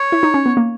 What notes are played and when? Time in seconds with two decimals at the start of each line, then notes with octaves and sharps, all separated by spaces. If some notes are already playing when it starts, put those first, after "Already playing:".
Already playing: C#5
0.12 E4
0.23 D#4
0.34 C#4
0.46 B3
0.57 A#3